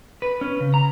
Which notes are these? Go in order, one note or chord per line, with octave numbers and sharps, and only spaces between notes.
B4
C#4
C#3
A#5